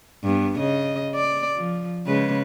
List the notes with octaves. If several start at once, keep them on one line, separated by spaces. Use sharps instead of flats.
G2 B3
C#3 D#5
D5
F3
C#3 G#3 B4